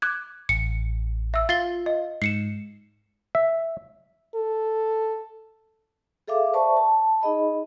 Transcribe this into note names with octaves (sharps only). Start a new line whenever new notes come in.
D6 F#6 G#6
A1 C#7
E5 E6
F4 A6 C7 G7
D#5
G#2 C7 C#7 E7
E5
A4
G#4 A4 E5 F5 D6
B4 C5 D5 E5 A5 C#6
A5
D#4 G#4 D#5 B5